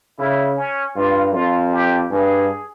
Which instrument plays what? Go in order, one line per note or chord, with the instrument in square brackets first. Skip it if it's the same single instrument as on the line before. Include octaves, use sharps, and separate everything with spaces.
[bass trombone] C#3 [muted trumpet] E4
[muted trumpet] C#4
[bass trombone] G2 [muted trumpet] F4
[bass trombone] F2 [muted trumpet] F4
[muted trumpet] G4
[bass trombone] G2 [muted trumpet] G#4